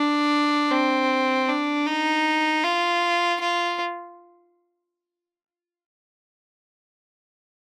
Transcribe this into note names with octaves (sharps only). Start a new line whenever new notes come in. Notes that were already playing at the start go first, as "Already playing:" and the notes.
Already playing: D4
C4
D4
D#4
F4
F4